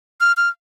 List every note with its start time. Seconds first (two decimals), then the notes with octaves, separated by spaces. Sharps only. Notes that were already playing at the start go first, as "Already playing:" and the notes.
0.21 F6
0.37 F6